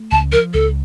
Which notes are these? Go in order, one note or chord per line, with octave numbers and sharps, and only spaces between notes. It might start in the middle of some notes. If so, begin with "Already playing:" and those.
Already playing: A3
C#2 A5
F3 A#4
C#2 A4